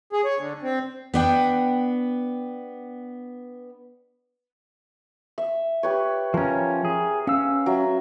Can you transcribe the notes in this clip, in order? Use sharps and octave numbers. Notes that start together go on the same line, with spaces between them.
G#4
C#5
D3
C4
B3 D4 G5
E5
G4 B4 C#5
F3 C#4 A#4 A#5
G#4
C#4 F5 E6
F#3 E5